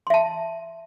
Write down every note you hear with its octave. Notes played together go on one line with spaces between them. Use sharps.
E5 A5 C6